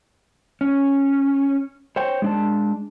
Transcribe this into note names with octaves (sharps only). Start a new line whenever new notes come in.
C#4
C5 C#5 G5
G#3 D4 A5